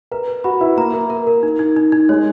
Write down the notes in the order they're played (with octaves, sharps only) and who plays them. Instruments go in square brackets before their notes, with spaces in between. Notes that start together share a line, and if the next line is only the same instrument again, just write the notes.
[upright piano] A#4 [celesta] B4
[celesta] B4
[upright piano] F#4 [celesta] B5
[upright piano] E4 [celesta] B4
[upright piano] A#3 [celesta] A#5
[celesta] A#4
A#4
A#4
D#4
D#4
D#4
D#4
[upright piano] G#3 [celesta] C#5